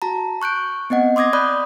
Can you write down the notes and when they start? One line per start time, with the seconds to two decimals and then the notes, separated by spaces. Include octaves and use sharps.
0.02 F#4 A5 A#5
0.42 C#6 F#6 G6 D7
0.90 B3 C4 D#5 F#5
1.16 C6 D6 D#6 G#6 A#6
1.33 D5 B5 D#6 F#6 G6